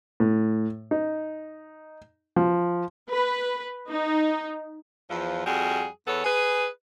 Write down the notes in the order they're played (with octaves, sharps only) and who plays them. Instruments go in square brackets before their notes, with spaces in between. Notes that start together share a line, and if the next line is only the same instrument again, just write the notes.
[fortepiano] A2
D#4
F3
[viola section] B4
D#4
[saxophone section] E2 F3
F2 G3 F#4 G#4
E2 B3 A4 C#5
G#4 B4